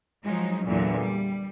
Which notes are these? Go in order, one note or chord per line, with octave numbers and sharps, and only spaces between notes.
F3 F#3 G#3 D#4
E2 A#2 D3 F#3
G3